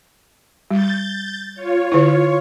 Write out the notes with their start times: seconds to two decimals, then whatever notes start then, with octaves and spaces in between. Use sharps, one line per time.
0.71 G3 G6 A6
1.55 F4 C#5
1.92 D3 E4